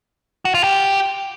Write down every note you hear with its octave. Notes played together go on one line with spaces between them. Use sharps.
F#4
F4
G4